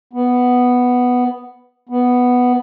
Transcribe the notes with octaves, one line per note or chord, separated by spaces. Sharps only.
B3
B3